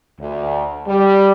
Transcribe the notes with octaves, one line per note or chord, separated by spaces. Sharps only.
D2
G3